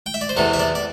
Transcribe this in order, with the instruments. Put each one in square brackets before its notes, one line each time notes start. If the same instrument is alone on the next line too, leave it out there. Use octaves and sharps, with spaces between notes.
[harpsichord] G5
E5
D5
C5
E2 C3 E3 A4
E5
D5
D5